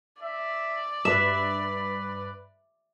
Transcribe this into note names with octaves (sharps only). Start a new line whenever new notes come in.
D5 E5
G2 B4 E5 B5